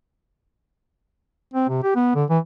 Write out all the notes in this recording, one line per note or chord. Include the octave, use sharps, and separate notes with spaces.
C4
C3
G4
B3
D3
E3